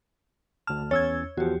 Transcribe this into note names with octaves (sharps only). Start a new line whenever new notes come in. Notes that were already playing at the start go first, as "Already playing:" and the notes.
D2 A5 F6
E2 C#4 C#5 E6 G#6 A6
E2 F3 F#4 G4